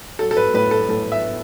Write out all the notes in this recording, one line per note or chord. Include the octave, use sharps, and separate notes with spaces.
F#3 A4
A4
B4
A2 B4
A4
A2 A4
E5